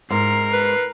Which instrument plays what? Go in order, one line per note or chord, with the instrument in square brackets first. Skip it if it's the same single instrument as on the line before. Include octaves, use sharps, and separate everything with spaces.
[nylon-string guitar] G#2 [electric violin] A#4 C7
[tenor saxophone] B4